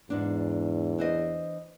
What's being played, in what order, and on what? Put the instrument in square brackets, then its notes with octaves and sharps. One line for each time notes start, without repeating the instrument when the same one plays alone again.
[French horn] E2 [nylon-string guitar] G#2 D4
[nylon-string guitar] E3 C5 D#5